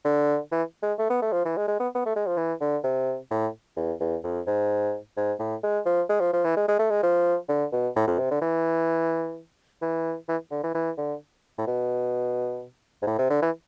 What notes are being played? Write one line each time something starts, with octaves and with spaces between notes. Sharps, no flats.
D3
E3
G#3
A3
B3
A3
F3
E3
G#3
G#3
B3
B3
A3
G#3
F3
E3
D3
C3
A2
E2
E2
F2
G#2
G#2
A2
G#3
F3
G#3
F3
F3
E3
G#3
G#3
A3
G#3
F3
D3
B2
A2
F2
C3
D3
E3
E3
E3
D3
E3
E3
D3
A2
B2
G#2
A2
C3
D3
E3